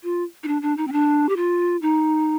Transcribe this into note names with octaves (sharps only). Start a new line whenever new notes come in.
F4
D#4
D4
D4
D#4
C4
D4
G4
F4
D#4